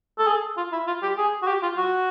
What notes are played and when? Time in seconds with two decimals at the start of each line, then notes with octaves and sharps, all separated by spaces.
0.19 A4
0.27 G#4
0.57 F4
0.72 E4
0.87 F4
1.03 G4
1.17 G#4
1.42 F#4
1.47 G4
1.62 F4
1.77 F#4